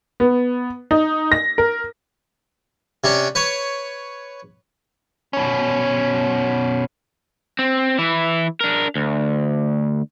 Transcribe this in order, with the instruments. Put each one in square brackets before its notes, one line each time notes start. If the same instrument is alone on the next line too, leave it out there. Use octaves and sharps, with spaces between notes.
[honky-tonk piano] B3
D#4
A#6
A#4
[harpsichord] C3 C#4 D4
B4 C#5
[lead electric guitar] B2 C#4
[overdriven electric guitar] C4
E3 E4
D4 A#4
D2